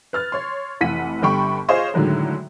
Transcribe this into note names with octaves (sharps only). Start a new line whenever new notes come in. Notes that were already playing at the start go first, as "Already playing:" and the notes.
B4 F6 A6
C#5 C6
F1 E3 F#5 B6 D#7
G1 D3 G3 G5 B5 C#6
F4 G#4 C5 C#5 D#5 F5
A2 D3 D#3 F#3 G#3